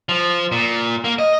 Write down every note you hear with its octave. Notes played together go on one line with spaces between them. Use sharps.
F3
A#2
A#3
D#5